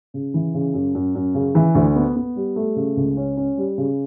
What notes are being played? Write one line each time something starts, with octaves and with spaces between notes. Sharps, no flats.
C#3
E3
C#3
F#2
F#2
F#2
C#3
E3
D2
B3
B3
G3
A3
C#3
C#2
C#4
C#4
G3
C#3